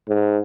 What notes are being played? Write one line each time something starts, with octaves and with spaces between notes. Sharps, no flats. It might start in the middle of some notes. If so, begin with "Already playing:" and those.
G#2